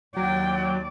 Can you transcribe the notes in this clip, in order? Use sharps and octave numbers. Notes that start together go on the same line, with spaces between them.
D#2 F#3 D5 G5